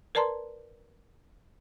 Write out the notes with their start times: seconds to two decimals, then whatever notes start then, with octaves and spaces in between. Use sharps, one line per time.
0.15 A#4 B4 D5 A5 A#5 C6